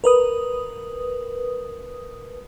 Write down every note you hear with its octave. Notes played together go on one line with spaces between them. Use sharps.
A#4 B4 D#6